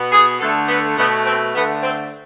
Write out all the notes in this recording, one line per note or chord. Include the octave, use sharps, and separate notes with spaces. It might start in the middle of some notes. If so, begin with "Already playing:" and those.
Already playing: B2 B3
G#4
D3 A3 A4
B3
B2 A3 B3
C4
D3 A3 B3
C4